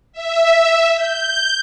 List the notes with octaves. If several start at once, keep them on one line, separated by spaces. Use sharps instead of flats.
E5
G6